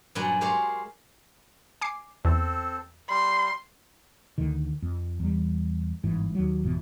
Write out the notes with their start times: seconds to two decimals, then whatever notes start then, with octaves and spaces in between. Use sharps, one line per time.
0.15 G2 A#2 F#3 G3 F#5 G#5
0.41 G#3 G4 A#4 C5 C#5 F5
1.81 G#5 D6 C7
2.25 E2 C4 A4
3.09 G3 C6
4.38 D2 D3 D#3
4.82 F2
5.20 E2 G3
6.04 G1 G#2 E3
6.35 D#2 F#3
6.63 G#1 F2 B2 E3